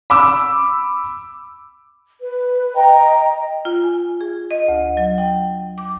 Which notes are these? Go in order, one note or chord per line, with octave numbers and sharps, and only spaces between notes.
B5 D6 E6
B4
D#5 G5 A#5
F4
G#5
G#4
D#5
D2
F#3
G5
D6